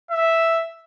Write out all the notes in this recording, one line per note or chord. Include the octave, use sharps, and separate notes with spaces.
E5